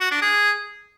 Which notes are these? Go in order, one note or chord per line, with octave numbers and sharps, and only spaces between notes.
F#4
D4
G#4